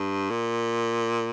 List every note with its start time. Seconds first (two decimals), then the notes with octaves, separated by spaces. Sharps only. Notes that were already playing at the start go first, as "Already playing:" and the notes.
Already playing: G2
0.30 A#2